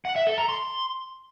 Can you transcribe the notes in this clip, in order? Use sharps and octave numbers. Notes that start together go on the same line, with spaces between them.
F#5
E5
A4
A#5
C6